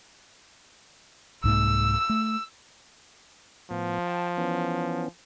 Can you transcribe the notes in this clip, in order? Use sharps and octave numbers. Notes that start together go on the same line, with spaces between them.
C2 G#2 A#3 E6
A3
A2 F3 B3
G5 A5
E3 B3 C#4